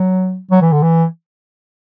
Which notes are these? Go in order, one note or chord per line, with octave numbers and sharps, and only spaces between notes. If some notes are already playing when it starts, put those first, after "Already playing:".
Already playing: F#3
F#3
E3
D3
E3